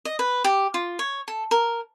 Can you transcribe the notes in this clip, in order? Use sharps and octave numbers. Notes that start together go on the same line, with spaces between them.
D#5
B4
G4
F4
C#5
A4
A#4